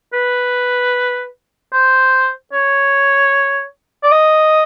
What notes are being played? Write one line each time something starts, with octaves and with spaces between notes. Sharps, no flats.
B4
C5
C#5
D5
D#5